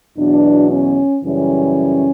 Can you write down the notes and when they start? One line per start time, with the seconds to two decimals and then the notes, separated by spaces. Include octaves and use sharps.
0.17 E2 B2 F#3 D4
0.70 C#4
1.24 F#2 C#3 E3 G3 C#4